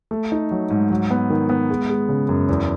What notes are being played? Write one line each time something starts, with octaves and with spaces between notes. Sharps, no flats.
A3
D#4
F#3
G#2
F#3
B3
D#3
B3
G#3
G#3
C#3
F#2
E2